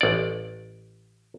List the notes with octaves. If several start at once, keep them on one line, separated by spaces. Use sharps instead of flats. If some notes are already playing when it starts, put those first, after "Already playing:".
A1 D5